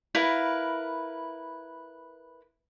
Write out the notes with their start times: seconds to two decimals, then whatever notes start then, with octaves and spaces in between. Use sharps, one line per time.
0.15 E4 A#4 B4 F5